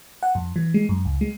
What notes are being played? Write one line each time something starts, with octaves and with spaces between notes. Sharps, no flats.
F#5
F2
E3
G#3
F#2
C#2
G#3